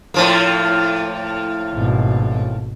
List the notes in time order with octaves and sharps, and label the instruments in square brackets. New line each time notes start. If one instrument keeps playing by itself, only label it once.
[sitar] A2 F3 A#3
[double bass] G#1 B2